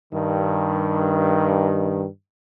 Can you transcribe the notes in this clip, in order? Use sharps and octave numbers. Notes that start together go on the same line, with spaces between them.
G2 D#3